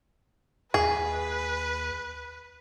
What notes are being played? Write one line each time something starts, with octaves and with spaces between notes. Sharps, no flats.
D#2 G#4 B4